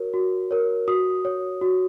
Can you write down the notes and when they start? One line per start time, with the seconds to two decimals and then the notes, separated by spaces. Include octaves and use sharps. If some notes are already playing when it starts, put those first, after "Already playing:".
Already playing: F#4 A#4 C#5
0.13 F#4
0.51 A#4 C#5
0.88 F#4 D#6
1.25 C#5
1.61 F#4